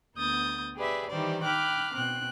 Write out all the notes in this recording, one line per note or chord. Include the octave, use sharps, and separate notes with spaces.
D2 B3 D#6 G6 A6
G4 G#4 B4 D5 E5
D#3 E3 G3 G4 C5 D5
G5 B5 D6 F6 F#6
B2 C4 G5 F#6